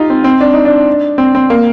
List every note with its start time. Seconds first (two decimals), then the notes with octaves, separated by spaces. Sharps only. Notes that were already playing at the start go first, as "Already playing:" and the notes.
Already playing: D#4 F4 G4
0.10 C4
0.24 C4
0.41 D4
0.53 D#4
0.65 D4
1.18 C4
1.35 C4
1.50 A#3